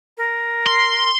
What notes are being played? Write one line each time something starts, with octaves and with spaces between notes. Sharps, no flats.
A#4
C6